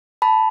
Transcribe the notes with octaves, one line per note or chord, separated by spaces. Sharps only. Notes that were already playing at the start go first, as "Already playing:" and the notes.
A5 B5